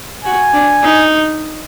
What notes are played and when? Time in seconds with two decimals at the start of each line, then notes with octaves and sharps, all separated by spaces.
0.25 F#4 G#5
0.53 D4
0.82 D#4